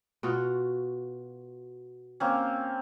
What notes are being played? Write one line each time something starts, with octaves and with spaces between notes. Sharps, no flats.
B2 F4 F#4
A#3 C4 C#4